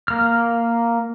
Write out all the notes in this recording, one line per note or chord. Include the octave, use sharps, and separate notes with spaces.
A#3 F6